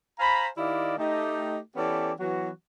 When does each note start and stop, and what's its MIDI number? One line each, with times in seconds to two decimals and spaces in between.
0.19 0.47 72
0.19 0.47 77
0.19 0.47 80
0.19 0.47 82
0.19 0.47 83
0.57 0.94 51
0.57 0.94 64
0.57 0.94 67
0.57 0.94 74
0.57 0.94 75
0.57 0.94 77
0.98 1.59 57
0.98 1.59 63
0.98 1.59 67
1.76 2.11 52
1.76 2.11 59
1.76 2.11 61
1.76 2.11 67
1.76 2.11 69
1.76 2.11 74
2.20 2.50 52
2.20 2.50 54
2.20 2.50 59
2.20 2.50 66